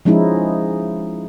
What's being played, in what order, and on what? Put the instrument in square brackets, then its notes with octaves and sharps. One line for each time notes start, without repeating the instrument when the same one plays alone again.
[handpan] F3 G#3 C#4 D#4 E4